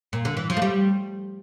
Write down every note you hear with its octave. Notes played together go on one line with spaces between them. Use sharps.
A#2
D3
E3
F3
A3
G3